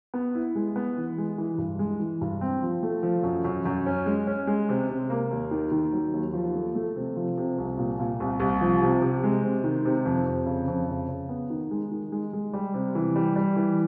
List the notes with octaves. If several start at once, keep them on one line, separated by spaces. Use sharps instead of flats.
B3
E4
G#3
B3
E3
G#3
E3
G2
G#3
E3
G2
C4
F3
A3
F3
F#2
F#2
F#2
C#4
G#3
C#4
G#3
C3
C3
A#3
D#2
D#3
D#3
F#3
D#2
F3
A3
A3
C3
F3
C3
C2
A#2
A#2
C2
C2
F3
C3
C3
G#3
C3
D#3
C3
F2
F2
C#3
F2
C#3
C#3
B3
D#3
G#3
D#3
G#3
G#3
G3
C3
E3
G3
G3
E3